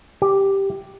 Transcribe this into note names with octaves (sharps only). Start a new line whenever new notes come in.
G4